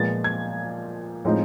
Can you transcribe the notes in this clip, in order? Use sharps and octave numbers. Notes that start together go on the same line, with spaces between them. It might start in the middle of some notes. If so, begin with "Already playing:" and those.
Already playing: A#2 F3 G#3 B3 A6
G#6
A2 F3 G#3 C4 D#4